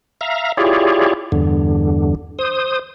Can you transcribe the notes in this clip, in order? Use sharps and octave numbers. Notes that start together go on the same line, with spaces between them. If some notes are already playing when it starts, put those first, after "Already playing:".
E5 F5 A#5
E4 F4 G4 G#4 C#5 D5
E2 G2 D3
C5 D#6